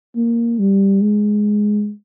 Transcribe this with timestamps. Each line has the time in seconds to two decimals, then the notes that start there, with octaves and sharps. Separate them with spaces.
0.16 A#3
0.59 G3
1.01 G#3